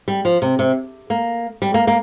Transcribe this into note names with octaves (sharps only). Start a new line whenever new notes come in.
G3
F3
C3
C3
A#3
G3
A#3
A#3